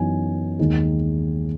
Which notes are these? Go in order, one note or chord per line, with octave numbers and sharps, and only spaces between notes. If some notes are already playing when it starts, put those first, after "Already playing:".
Already playing: F#2 E3 B3 D#4 G#5
D#2 D#3 G#3 D#4